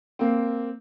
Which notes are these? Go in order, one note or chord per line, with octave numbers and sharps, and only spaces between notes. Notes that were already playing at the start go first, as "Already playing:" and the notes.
A#3 C4